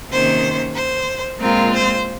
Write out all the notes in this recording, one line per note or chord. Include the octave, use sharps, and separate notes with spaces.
C3 D#3 A#3 C#4 C5
C5
A#2 G#3 C4 F4 A#4
C5